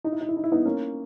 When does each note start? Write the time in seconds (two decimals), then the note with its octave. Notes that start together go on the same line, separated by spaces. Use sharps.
0.04 D#4
0.12 E4
0.21 D#4
0.29 E4
0.37 D#4
0.44 E4
0.52 B3 D#4
0.65 A#3 C#4